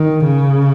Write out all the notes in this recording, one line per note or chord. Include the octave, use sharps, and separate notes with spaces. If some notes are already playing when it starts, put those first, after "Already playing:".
Already playing: D#3
C#3